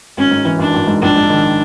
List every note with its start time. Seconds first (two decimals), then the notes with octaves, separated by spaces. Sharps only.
0.17 G#1 C#4
0.31 G#2
0.45 E3
0.59 G#1 D4
0.74 G#1
0.87 G#2
1.02 A#1 D4
1.16 G#2
1.30 D#3